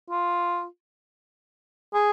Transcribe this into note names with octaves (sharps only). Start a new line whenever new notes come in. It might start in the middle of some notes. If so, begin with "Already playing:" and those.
F4
G#4